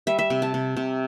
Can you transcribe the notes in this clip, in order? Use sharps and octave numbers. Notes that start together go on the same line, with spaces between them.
G3 E5
E5
C3
A5
C3
C3